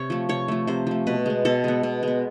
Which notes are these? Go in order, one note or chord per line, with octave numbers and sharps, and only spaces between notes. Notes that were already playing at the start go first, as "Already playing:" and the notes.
Already playing: C3 C#5
F3 A3
C3 C#5
F3 A3
C3 C5
F3 A3
B2 B4
G#3 B3
B2 A4
G#3 B3
B2
G#3 B3